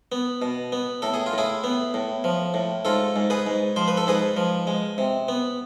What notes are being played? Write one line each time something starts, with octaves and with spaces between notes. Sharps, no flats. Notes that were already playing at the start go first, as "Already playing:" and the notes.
B3
B2
B3
A2 A4
G#4
F4
A2 E4 G#4
B3
A2
F3
A2
G#2 F4 A4
G#2
G#4 B4
G#2
F3 C5
B4
A4
G#2 G#4 B4
F3
G#3
C3
B3